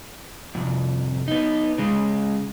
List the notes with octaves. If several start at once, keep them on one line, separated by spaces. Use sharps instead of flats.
C2 F2
B3 D#4
C#3 G#3